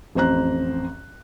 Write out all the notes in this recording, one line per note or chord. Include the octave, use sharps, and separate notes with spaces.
A1 F2 C5 A#5 F#6